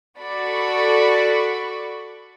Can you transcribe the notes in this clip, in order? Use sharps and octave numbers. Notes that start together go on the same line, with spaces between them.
F#4 A4 D5 B5 C#6